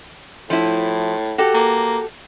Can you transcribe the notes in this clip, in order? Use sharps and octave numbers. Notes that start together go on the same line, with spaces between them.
A2 F3 E4
F#4 G4 A4
A#3